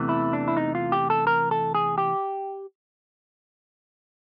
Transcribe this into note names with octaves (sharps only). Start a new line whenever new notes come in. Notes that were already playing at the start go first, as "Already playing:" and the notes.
Already playing: E2 C3 E3 A3
E4
D4
E4
D#4
F4
G4
A4
A#4
A4
G#4
G4